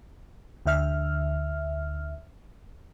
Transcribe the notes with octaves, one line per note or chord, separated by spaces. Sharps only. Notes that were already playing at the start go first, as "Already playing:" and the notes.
D2 D3 E5 F6